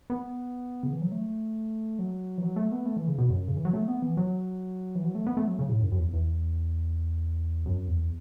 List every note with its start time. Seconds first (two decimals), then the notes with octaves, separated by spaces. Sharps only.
0.10 B3
0.83 C#3
0.93 E3
1.01 F#3
1.12 A3
1.99 F#3
2.38 E3
2.43 F#3
2.56 A3
2.72 B3
2.86 A3
2.97 E3
3.08 C#3
3.18 B2
3.30 F#2
3.48 C#3
3.57 E3
3.65 F#3
3.73 A3
3.88 B3
4.02 E3
4.17 F#3
4.95 E3
5.04 F#3
5.15 A3
5.27 B3
5.37 A3
5.48 F#3
5.59 C#3
5.69 A2
5.81 F#2
5.92 F#2
5.99 E2
6.13 E2
7.66 F#2
7.87 E2